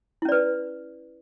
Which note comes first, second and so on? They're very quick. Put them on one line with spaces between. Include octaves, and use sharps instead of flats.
E4 C#4 D5 B4